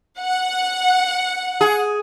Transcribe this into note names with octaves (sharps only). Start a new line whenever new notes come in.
F#5
G#4